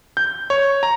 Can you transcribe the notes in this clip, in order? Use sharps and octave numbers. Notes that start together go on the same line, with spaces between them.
G6
C#5
A#5